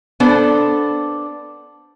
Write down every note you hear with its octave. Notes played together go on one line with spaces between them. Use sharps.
B3 D4 A4 C5